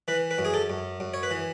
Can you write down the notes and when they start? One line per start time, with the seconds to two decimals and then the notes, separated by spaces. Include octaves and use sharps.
0.08 E3 B4
0.31 B4
0.38 F#2
0.45 G#4
0.54 A4
0.70 F#2
1.00 F#2
1.14 C#5
1.23 B4
1.31 E3